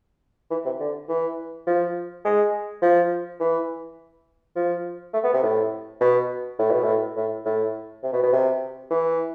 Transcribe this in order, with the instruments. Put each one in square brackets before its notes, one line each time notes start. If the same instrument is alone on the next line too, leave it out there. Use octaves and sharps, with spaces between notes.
[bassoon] E3
C3
D3
E3
F3
G#3
F3
E3
F3
A3
B3
C3
A2
B2
A2
B2
A2
A2
A2
C3
B2
B2
C3
E3